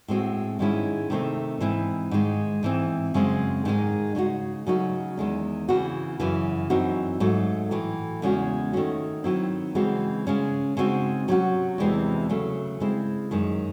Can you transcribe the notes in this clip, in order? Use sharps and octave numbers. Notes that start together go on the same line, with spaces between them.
A2 G#3 C4 F#4
G#2 D#3 G#3 C#4 E4
C3 D#3 A3 C4 D#4
G#2 E3 C4 E4
G#2 D#3 G#3
G#2 E3 C4
F#2 C#3 G#3 C4
G#2 D#3 G#3 D#4
C#3 G#3 D#4 F#4
C#3 F#3 A3 D#4 F#4
E2 D#3 G#3 C#4
C#3 E3 C4 F#4
F#2 C#3 E3
F#2 E3 C4 D#4 F#4
G#2 F#3 A3
A2 E3 A3
E2 C#3 G#3 C#4 F#4
D#3 A3 C#4 F#4
D#3 F#3 C4 E4
C#3 E3 G#3 C4 F#4
C#3 G#3 C#4
C#3 G#3 C4 D#4 F#4
C3 F#3 C#4 F#4
E2 C3 E3 G#3 C4
C#3 F#3 A3
C#3 G#3 C4 E4
F#2 D#3 G#3